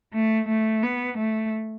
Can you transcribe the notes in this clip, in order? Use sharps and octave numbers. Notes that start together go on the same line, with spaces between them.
A3
A3
B3
A3